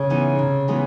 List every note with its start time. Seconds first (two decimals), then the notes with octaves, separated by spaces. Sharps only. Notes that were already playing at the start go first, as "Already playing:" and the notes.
Already playing: C#3
0.10 E3 G#3 B3 D#4
0.39 C3
0.68 E3 G#3 B3 D#4